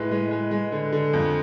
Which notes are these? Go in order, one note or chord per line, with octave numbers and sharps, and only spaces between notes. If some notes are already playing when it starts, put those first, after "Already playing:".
Already playing: A2 G#3 B4
G#3
G#3
G#3
D3
D3
F2